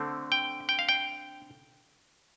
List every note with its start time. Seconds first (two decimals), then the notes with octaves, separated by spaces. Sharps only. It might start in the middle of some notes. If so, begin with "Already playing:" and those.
Already playing: D3 A3 C4
0.32 G5
0.69 G5
0.79 F5
0.89 G5